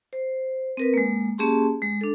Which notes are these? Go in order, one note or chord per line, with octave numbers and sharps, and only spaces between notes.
C5
C4 A#4 B4
G#3 A#3
A#3 C#4 G4 G#4 A5 C6
G#3
D4 A4